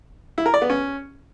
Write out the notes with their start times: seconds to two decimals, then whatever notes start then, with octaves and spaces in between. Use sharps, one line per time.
0.38 E4
0.46 A#4
0.54 D5
0.62 B3
0.70 C#4